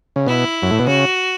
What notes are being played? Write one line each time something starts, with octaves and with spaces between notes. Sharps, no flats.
C#3
B2 E4
F#2
A2
B2
C#3 F#4